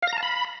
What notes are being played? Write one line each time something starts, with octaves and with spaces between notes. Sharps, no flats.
F5
A#6
A#5
A5
B5